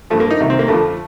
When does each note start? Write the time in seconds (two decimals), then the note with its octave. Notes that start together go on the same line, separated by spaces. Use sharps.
0.10 G2 F3 A3
0.20 A#3
0.30 D#4
0.40 C2 C3 D#3
0.50 C4
0.59 A#3
0.68 F2 D3 F3 A3